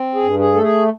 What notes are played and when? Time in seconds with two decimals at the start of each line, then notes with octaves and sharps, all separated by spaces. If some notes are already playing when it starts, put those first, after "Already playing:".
Already playing: C4
0.15 G#4
0.23 G2
0.39 G#4
0.54 A3 A4
0.62 G#4